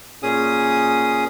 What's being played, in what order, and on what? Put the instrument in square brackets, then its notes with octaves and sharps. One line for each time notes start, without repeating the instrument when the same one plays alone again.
[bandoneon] A#2 C#4 G#4 D#6